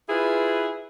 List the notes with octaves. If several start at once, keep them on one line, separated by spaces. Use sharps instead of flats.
E4 F4 G#4 B4